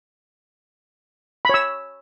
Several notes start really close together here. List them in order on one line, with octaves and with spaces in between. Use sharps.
B5 C#5 E6